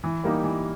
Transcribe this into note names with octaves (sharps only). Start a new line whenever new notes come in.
E3
G3 A#3 D#4 G4
E3